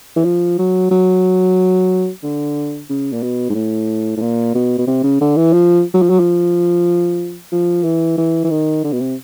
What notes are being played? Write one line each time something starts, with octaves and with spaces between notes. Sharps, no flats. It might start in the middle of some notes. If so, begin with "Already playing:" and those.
E3
F3
F#3
F#3
D3
C#3
A#2
B2
G#2
A2
A2
A#2
B2
B2
C3
C#3
D3
E3
F3
F#3
F3
F#3
F3
F3
E3
E3
E3
D#3
D3
B2
C3